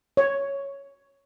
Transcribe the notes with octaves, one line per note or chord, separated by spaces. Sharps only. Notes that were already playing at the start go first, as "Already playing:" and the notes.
C#5